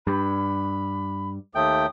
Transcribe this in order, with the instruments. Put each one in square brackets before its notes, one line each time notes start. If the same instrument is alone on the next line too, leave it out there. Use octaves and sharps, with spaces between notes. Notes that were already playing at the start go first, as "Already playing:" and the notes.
[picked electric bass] G2 [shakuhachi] B5
[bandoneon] D#2 A3 G5 [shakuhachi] D#6